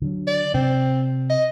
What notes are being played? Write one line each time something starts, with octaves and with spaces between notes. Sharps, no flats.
D3 F#3
D5
C3 C4
D#5